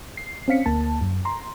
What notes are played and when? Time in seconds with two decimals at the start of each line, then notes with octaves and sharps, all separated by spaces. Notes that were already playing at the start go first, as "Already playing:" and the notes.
0.17 C7
0.48 C4 C#4 F5 B6 C#7
0.66 D2 A#3 A5
1.01 F#2
1.25 A#5 C6